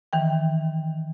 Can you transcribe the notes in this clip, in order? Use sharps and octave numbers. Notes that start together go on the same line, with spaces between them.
D#3 E3 G5